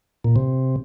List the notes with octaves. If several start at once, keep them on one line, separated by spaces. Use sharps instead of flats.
A#2
C3